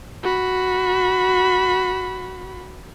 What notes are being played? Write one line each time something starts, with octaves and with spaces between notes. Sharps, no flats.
F#4 B5